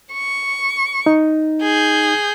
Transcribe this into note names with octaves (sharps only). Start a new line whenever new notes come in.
C#6
D#4
G#4 G6